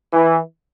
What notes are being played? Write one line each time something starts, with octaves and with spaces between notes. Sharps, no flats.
E3